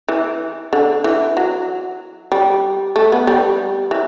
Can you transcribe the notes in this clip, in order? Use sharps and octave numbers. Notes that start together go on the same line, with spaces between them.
E3
D3
E3
F#3
G3
A3
B3
G3
E3